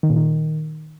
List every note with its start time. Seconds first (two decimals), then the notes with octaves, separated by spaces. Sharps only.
0.03 D#3
0.10 A#2
0.16 D#3